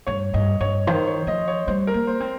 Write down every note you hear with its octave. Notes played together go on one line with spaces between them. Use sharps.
G2 C#5
G2 D#5
G2 C#5
D#3 C5
C#5
F3 D#5
C#5
G3 C5
A#4
A#3
C5
C4